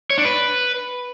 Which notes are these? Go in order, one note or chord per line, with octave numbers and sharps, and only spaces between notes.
C#5
D4
B4